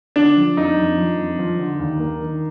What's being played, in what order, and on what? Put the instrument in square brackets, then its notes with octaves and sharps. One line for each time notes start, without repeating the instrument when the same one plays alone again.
[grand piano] D3 [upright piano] D4
[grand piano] F3
[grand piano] F2 [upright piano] D#4
[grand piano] F2
F3
F2
F3
D3
D#2
A#3
D#3